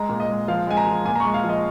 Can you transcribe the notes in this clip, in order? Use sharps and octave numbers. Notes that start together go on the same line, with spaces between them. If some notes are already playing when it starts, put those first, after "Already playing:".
Already playing: G#3 A#5
A#2
D#5
G#3
F3 F5
G#3 G#5
A#5
F3
A#2 G#5
A#5
G#3 C#6
F5
F3
D#5